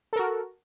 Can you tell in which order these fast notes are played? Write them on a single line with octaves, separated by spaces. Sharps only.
A4 A#4 F#4